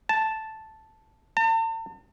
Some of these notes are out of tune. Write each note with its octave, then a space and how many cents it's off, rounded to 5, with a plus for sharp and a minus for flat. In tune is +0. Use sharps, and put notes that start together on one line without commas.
A5 +0
A5 +45